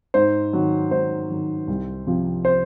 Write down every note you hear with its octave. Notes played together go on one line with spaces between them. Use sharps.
G#2 C5
D#3 F#3
G#2 C5
D#3 F#3
C2
C3 F3
C5